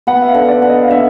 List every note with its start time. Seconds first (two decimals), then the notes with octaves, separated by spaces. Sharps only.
0.07 B3 F#5
0.22 E5
0.28 F5
0.34 D3
0.48 D5
0.62 D3
0.70 D#5
0.83 F5
0.91 D3 E5